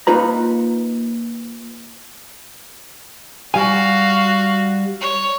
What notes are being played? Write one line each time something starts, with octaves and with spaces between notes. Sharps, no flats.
A#3 D#4 F4 B4 A#5
G3 F#4 F5 G#5
C#5